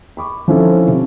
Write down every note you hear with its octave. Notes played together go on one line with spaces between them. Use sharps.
B5 C#6 D6
F3 C4 C#4 D#4 E4 A4
C3